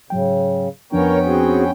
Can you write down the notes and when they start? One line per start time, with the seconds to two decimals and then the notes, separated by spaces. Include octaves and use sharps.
0.10 G#2 C#3 F#3 G5
0.92 F2 F3 B3 C#4 D4 A#4 C#5 G5
1.25 C4 F#4 G#4